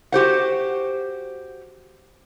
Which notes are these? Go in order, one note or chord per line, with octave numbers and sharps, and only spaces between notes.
F#4 G4 C5 F#5